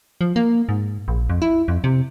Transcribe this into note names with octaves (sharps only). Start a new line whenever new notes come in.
F3
A#3
G#2
A#1
F2
E4
F2
C3